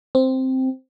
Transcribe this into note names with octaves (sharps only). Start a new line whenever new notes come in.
C4